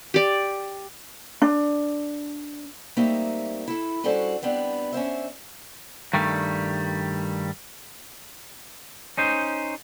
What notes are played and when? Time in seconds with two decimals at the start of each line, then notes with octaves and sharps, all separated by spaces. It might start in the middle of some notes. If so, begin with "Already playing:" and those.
0.14 G4 D5
1.42 D4
2.96 G3 A3 A#3 C4 D#4 E5
3.68 E4 A4
4.04 G3 C#4 D4 F#4 A4 C5
4.42 G3 B3 C4 D4
4.93 C#4 D4 C5 E5
6.13 G2 D#3 G3 A3
9.17 C#4 D#4 C5